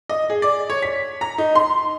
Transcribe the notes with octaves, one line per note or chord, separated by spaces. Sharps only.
D#5
G#4
D5
C#5
B6
A#5
D#4
C6